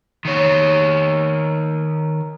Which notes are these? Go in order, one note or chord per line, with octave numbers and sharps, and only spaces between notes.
D#3 C#5